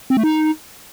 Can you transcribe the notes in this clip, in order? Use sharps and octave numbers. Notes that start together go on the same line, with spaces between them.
C4
A3
D#4